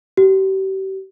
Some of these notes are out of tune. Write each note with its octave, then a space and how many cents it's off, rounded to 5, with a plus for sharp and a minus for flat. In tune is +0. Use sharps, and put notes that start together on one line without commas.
G4 -35